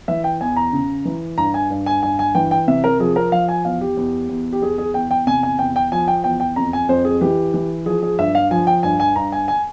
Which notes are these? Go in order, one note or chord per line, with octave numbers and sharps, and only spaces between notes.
E3 E5
G5
E2 G#5
A#5
C#3
E3
G2 A#5
G#5
G2
G#5
G2 G#5
G#5
E3 G5
G5
C3 E5
A#4
F3 G#4
A#4
F3 F5
G#5
E2 F5
G4
E2
E2
G4
E2 G#4
G#4
E2 G5
G5
C3 G#5
G#5
E2 G5
G5
F3 G#5
G5
E2 G5
G5
F2 A#5
G#5
F2 C5
G#4
E3 G4
E3
F3 G#4
G#4
G2 E5
F5
F3 G#5
G5
G2 G#5
G#5
G2 A#5
G#5
G#5